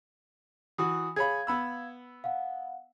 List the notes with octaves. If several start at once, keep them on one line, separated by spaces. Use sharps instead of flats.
E3 F#4 D#6
G#4 C#5 F5 B5 G#6
B3 B5 E6
F5 F#5